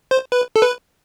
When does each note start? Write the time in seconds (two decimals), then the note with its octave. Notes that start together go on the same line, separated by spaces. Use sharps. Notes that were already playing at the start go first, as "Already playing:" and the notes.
0.11 C5
0.32 B4
0.56 A4
0.62 B4